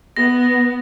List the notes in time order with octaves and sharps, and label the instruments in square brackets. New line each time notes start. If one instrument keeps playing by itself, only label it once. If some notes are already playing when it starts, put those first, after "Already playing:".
[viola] B3 [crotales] A#6